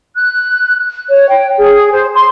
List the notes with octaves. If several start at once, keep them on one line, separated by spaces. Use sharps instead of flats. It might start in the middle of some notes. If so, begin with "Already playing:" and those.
F#6
C#5
G5
G#4
C5
C6